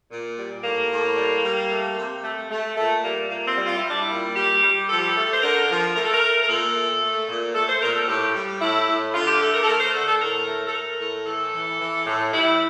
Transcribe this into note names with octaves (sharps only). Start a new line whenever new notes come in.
A#2
G3
A2 A#3
A2
G3
G3
A3
C3
A3
A3
A#2 A3
G3 A#3
A#2 A#3
C4
G3
F4
E4
G3
D4
E4
A#2
G3 G4
G3
F3 A4
G4
A4
A3
C5
D3 A#4
F3
A3 A#4
A4
A#4
A3
A#4
A#2 A4
A3
A3
A#2
A3 A4
C5
A#2 A#4
A4
A2 G4
G3
A2 E4
A2
D3 F4
G4
A3 A4
A#4
A4
A3 A#4
C5
D3 A4
A4
A2 A#4
A3
A4
A3 A#4
A2
E3 A4
E3
E3
A2
G3 E4